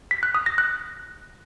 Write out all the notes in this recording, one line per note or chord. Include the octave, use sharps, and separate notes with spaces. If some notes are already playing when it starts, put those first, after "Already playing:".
B6
F#6
D#6
A#6
F#6